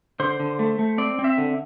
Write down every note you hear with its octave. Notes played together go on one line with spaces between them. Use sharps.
D3 C5
D3
A3
A3
C4 D5
C4
E5
D3